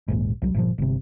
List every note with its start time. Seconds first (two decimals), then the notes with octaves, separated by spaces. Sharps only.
0.08 D#1 A#1 G#2
0.42 C2 F#3
0.54 G1 A#2 F3
0.78 G1 C3